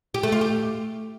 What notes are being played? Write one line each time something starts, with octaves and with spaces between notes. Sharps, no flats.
G4
A3
F4
G4